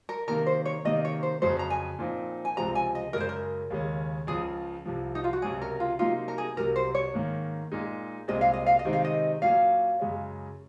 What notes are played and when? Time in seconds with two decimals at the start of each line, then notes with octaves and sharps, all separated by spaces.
0.09 A#4
0.27 C3 D#3 A#3 A#4
0.47 C5
0.65 C#5
0.85 C3 D#3 A#3 D#5
1.05 C#5
1.23 C5
1.42 F2 C#3 F#3 C5
1.59 A#5
1.70 G#5
1.99 A#2 F3 C4 D#4
2.45 G#5
2.56 C#2 C3 F3 G#3 C4 A#5
2.75 G#5
2.95 D#5
3.13 F#2 C#3 G#3 A#4
3.20 C5
3.29 A#4
3.70 D#2 C#3 G#3 C#4
4.27 C#2 C#3 F3 G#4
4.85 C2 C3 F3
5.15 D#4
5.24 F4
5.33 F#4
5.42 C#2 C3 F#3 C#4 G#4
5.62 A#4
5.80 F4
5.99 C3 F#3 A#3 D#4 F4
6.28 A#4
6.38 G#4
6.57 C2 C3 F#3 A#4
6.76 C5
6.95 C#5
7.13 G#2 D#3 A#3 C#4
7.72 A#2 G#3 D#4
8.28 C2 A#2 G#3 C4 D#5
8.41 F5
8.53 D#5
8.66 F5
8.79 D#5
8.85 C3 D#3 G#3 C4 D#4
8.93 F5
9.05 D#5
9.42 A#2 F#3 C#4 F5
10.00 F#2 C#3 G#3 C#4